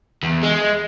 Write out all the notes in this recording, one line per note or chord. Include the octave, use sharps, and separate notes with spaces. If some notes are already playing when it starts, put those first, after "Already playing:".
E2
G#3